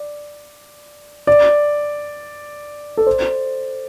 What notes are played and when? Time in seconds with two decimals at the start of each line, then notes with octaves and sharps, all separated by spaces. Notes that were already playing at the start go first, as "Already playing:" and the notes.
Already playing: D5
1.27 D5
2.97 A4
3.07 C5